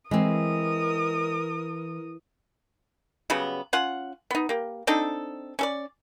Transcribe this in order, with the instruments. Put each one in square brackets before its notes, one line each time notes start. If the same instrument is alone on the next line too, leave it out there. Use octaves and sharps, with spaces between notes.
[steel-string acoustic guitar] E3 [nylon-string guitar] G#3 C4 [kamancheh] A#4 D#6
[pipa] C#3 F#3 G3 B3
C#4 F4 F#5
B3 D#4
A#3 G4
C4 D4 D#4 A4
C#4 A4 D5